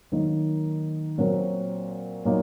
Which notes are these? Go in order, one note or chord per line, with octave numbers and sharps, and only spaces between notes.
D#3 F#3 A#3 D#4
A#2 F#3 C4 F#4 A#4
A#2 F#3 A#3 D#4